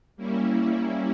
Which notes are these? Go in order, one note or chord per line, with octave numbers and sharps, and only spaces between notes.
G3 A#3 C#4 E4